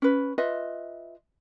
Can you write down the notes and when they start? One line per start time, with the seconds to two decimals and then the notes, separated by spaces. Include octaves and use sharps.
0.02 C#4 B4
0.38 F4 B4 D#5 E5